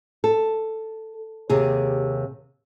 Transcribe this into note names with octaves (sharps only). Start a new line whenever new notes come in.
A4
D#2 C3 G#4